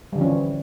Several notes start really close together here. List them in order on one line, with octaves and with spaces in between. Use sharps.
G3 D3 F3 C#4 E3